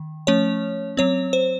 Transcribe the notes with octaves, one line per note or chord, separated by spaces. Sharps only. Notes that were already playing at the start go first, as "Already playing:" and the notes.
Already playing: D#3
F3 A3 C#4 C#5
F#3 C4 C#5
C5